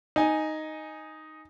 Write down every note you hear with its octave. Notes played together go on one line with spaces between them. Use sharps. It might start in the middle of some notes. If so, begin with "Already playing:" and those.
D#4 G#5